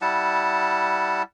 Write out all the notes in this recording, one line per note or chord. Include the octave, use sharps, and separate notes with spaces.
G3 E4 F#5 A5